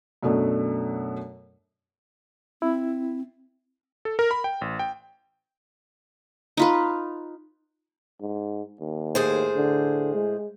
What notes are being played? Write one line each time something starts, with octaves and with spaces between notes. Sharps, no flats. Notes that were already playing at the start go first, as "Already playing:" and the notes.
F#2 B2 A3 D4
C4 E4
A4
A#4
B5
G5
A1
G5
D#4 F4 B4
G#2
D#2
A2 G#4 C5
D3
G#3